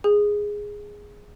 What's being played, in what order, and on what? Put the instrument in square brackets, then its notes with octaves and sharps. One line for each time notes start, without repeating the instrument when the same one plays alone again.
[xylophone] G#4